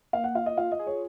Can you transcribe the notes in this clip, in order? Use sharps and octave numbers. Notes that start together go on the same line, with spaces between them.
A#3 F5
F#5
F4 F5
D#5
F4 F5
D#5
G#4
C#5